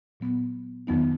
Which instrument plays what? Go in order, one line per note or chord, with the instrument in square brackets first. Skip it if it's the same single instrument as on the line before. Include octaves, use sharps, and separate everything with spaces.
[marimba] A#2 F#3 B3
F2 D#3 F#3 B3 D#4